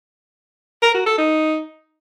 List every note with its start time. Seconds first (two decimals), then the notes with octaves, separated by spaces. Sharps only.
0.83 A#4
0.94 F#4
1.06 A4
1.18 D#4